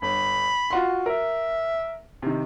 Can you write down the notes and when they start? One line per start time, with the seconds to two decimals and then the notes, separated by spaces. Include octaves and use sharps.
0.02 G1 B5
0.70 F4 F#4 C6
1.06 A#4 E5
2.22 C3 D#3